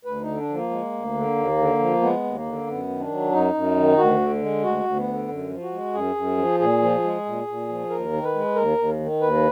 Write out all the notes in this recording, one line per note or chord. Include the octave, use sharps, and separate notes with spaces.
D2 B4
D#4
D3
D4
F3
A#3
G#3
D2
D3
D#2
D3
F3
G#3 B3
D#2
A#3
D3
F#2 B3
D#3
D4
F#3
F#2 D#4
F#2
D#3
D2 F#4
D3
G#3
D2 F#4
D2
B3
D3
F#2
F3
F#4
G#3
F#2 G#4
F#2
F3
A#2 G#4
F3
G#3
A#2
A#2
F3
D#2 A#4
D#3
B4
G#3
D#2 A#4
D#2
D#3
D#2 B4